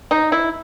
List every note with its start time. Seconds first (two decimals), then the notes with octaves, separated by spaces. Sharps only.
0.11 D#4
0.32 E4